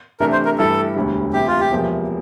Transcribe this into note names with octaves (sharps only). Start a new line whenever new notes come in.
C3 E3 A3 D4 A#4
C5
A#4
G2 E3 A3 E4 G4 A4
E1 D2 D3 G3
D2 C3 E3 G4
F4
G4
E1 E2 C3 F3 A#3